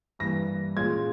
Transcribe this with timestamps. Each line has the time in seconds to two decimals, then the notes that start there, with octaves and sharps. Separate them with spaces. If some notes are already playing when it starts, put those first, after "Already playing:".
0.19 G2 E3 G3 A#3 A#6
0.76 A#2 G#3 C#4 F4 G#6